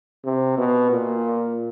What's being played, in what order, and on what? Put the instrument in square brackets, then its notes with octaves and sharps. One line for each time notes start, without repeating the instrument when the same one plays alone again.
[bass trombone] C3
B2
A#2